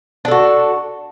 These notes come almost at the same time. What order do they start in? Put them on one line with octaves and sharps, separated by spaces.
D4 A4 F#4